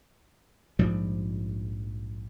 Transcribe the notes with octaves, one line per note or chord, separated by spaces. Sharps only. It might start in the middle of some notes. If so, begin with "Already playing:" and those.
A#1 G#2 F3 G3